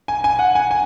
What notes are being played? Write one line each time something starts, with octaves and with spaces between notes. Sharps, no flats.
G#5
G#5
F#5
G#5
G#5